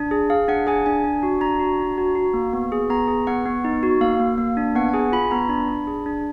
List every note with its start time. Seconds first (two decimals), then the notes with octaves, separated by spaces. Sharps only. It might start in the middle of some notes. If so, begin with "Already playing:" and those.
Already playing: D4
0.11 G#4
0.30 G#4 F5
0.48 D4 F#5
0.67 G#4 G#5
0.86 D4 G#5
1.04 D4
1.23 F#4
1.41 D4 A#5
1.59 F#4
1.79 D4
1.98 F#4
2.15 F#4
2.34 A#3
2.53 B3
2.72 G#4
2.90 B3 A#5
3.08 G#4
3.27 B3 F#5
3.46 B3
3.64 D#4
3.83 F#4
4.01 A#3 F5
4.20 A#3
4.38 A#3
4.57 D4
4.75 B3 F#5
4.89 F#5
4.93 G#4 G#5
5.12 F4 B5
5.31 B3 A#5
5.49 D4 B5
5.68 D4
5.87 G#4
6.06 D4